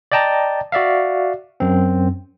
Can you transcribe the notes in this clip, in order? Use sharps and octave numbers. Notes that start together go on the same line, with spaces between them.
D5 D#5 G5 A5 A#5
F#4 D5 E5 F5
F#2 C4